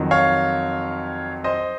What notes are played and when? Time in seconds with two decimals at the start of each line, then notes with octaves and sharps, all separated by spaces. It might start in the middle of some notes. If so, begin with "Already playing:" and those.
Already playing: F2 D#3 F#3
0.11 C#5 F5
1.44 C5 D#5